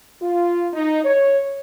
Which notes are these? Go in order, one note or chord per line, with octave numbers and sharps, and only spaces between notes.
F4
D#4
C#5